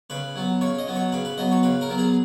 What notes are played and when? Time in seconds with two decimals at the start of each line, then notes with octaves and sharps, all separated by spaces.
0.10 C#3 B4
0.36 F#3 B3
0.61 C#3 C#5
0.79 D#5
0.87 F#3 B3
0.96 C#5
1.12 C#3 B4
1.25 B4
1.38 F#3 B3 D#5
1.51 C#5
1.63 C#3 B4
1.81 A#4
1.89 F#3 B3
1.98 G#4